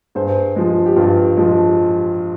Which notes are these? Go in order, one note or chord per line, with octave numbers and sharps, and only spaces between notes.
G2 G#4 C5
F3 G#3
G4
G2 F4
F3 G#3